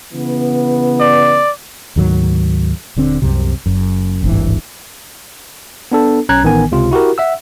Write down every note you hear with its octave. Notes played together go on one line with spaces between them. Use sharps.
C#3 E3 B3
D5
D2 G#2 D#3 F#3
D#1 D3 C4
C2 F#2 C3
F#1 F#2
D1 G#1 G2 E3
B3 D4 A4
B1 C#4 A#5 F#6 G#6
A1 D#3 B3 G#5
C#2 C3 F4
E4 F#4 G4 A#4
E5 F#5 E6